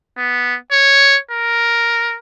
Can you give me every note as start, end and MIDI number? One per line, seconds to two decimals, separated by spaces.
0.18 0.55 59
0.72 1.17 73
1.31 2.17 70